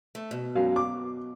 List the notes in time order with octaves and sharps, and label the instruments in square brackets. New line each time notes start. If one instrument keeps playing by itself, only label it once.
[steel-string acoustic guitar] A3
B2
[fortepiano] F#2 F#3 F5
D6